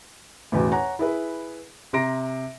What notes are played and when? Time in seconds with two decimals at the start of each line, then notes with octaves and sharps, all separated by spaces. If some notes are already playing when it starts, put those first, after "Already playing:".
0.52 A1 E2 B2
0.72 C#5 F#5 G#5 A#5
0.99 E4 G#4 B4
1.93 C3 A#5 C6 A#6 D7